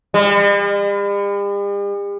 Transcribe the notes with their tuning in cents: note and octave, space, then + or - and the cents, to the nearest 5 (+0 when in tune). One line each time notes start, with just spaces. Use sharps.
G3 +45